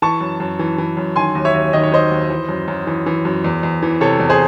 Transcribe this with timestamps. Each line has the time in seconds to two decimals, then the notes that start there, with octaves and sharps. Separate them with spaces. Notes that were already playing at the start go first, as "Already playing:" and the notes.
0.02 E3 A5 C#6
0.21 F#2
0.40 F#2
0.59 E3
0.78 E3
0.97 F#2
1.16 D#3 G#5 C6
1.35 D#2
1.45 C#5 E5
1.54 D#2
1.73 D#3 D#5
1.83 C#5
1.92 D#3 C5 D#5
2.11 D#2
2.30 E3
2.49 F#2
2.68 F#2
2.87 E3
3.06 E3
3.25 F#2
3.44 E2
3.63 E2
3.83 E3
4.01 C3 A4 C#5
4.20 E2
4.30 G#4 C5